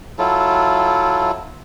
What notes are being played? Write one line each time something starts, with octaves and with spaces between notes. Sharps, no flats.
F#3 E4 F4 A4